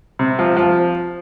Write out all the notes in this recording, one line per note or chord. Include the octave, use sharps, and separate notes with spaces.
C3
F3
F3